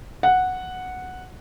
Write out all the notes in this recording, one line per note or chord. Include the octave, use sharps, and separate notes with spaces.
F#5